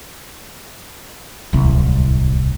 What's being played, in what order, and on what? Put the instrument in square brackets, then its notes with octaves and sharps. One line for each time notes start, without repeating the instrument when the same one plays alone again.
[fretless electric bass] D1 C2